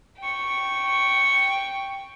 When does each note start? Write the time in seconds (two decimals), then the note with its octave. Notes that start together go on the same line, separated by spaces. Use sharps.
0.20 G5 C#6